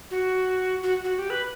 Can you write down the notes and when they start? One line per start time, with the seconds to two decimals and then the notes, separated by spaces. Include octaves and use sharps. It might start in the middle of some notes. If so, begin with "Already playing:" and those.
0.11 F#4
0.83 F#4
1.04 F#4
1.19 G4
1.30 B4